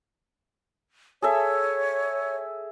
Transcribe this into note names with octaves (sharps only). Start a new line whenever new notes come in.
G#4 A4 C#5 E5